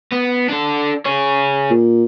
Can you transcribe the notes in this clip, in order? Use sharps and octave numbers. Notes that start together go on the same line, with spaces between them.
B3
D4 A4
G#4 C#5
A#2